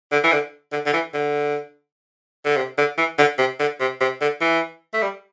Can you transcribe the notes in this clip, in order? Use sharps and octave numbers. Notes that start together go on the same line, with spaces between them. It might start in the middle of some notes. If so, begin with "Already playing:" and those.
D3
E3
D3
D3
D3
E3
D3
D3
C3
D3
E3
D3
C3
D3
C3
C3
D3
E3
A3
G3